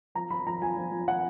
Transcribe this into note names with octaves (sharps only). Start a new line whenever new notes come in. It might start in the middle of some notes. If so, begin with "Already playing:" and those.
F3 A#5
F3 B5
F3 A#5
F3 G#5
F3
F3
F3 F#5